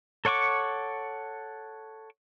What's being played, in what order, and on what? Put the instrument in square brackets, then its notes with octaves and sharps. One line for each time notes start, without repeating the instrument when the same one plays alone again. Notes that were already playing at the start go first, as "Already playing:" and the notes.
[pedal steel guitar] A4 C#5 F#5 C#6 D6